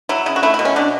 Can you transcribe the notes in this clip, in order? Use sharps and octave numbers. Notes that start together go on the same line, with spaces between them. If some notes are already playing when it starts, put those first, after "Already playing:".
F#3 E4
C#3 E4
F#4
A3 E4
E4
B2
C#4
B2 D4